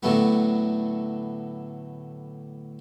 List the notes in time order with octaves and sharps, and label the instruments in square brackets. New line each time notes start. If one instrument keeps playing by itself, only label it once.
[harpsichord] A2 D3 F#3 A3 B3